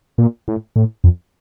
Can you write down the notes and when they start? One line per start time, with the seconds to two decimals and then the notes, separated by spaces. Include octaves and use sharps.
0.18 A#2
0.48 A2
0.76 A2
1.04 F2